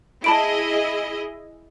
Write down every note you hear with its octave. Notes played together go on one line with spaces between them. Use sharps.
E4 G#4 D#5 A5 B5 D7